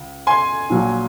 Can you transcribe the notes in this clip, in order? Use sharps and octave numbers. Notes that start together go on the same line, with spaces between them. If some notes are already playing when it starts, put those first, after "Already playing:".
Already playing: C#2
G#5 C6
A#1 A#2 F#3